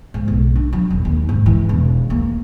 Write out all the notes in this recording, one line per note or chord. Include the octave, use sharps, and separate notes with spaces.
G#2
B1
D4
F#3
D#1
D#2
G#2
E3
E1
A#3